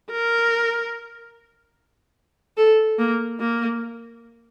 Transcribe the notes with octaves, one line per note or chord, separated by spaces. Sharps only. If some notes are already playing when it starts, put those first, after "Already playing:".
A#4
A4
A#3
A#3